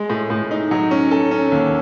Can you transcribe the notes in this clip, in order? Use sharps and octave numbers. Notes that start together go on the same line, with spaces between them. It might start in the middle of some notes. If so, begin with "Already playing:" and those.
Already playing: G#3
A2
A2
D#4
F#3
C#4
A4
C#4
D#2